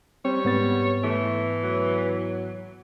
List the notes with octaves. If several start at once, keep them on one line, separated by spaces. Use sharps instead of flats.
G3 C4 C#5
G#2 B3 A6
E3 A3
F#3